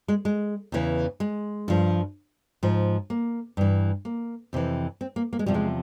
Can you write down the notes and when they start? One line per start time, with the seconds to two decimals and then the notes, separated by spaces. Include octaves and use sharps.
0.08 G#3
0.25 G#3
0.72 E2 C#3 E3
1.20 G#3
1.68 G2 F3
2.63 G#2 F3
3.10 A#3
3.57 G2 E3
4.05 A#3
4.53 F2 C3 E3
5.01 C4
5.16 A#3
5.33 A#3
5.39 G#3
5.46 E2 C3 F3 G3
5.54 G#3